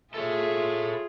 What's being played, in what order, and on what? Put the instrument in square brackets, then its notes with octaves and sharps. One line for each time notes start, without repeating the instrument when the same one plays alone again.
[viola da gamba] F4 G#4 [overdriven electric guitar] A4 C#5 [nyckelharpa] E5